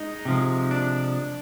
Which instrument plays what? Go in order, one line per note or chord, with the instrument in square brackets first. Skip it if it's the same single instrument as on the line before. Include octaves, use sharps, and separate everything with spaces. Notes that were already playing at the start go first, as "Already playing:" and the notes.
Already playing: [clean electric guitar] G#3 D#4
C3 F3 G#3
D4